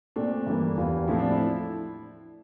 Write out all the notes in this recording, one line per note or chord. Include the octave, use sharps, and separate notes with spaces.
A#2 A3 C4 D4
G2 E3 A#3
E2 E3 G3 A#3 F4
A2 F3 A3 C4 E4
D4
E4